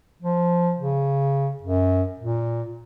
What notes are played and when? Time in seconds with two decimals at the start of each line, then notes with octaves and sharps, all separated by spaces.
0.22 F3
0.79 C#3
1.62 F#2
2.20 A#2